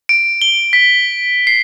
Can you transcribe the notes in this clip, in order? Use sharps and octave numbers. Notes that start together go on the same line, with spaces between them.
D7
G7
B6
C7